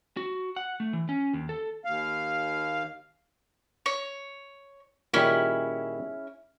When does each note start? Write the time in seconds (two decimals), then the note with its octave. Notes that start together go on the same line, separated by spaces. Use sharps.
0.17 F#4
0.56 F#5
0.80 A3
0.93 E3
1.09 C#4
1.33 D#2
1.49 A4
1.85 D#2 F5
3.86 C#5
5.14 A#2 D#3 G3 C#4 E4 G#4